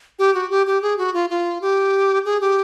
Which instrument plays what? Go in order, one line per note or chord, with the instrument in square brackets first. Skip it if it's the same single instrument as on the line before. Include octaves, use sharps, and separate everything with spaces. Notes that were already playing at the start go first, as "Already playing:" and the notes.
[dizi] G4
F#4
G4
G4
G#4
F#4
F4
F4
G4
G#4
G4